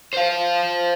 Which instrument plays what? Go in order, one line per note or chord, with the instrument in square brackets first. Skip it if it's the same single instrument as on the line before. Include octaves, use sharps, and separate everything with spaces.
[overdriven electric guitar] C5 F5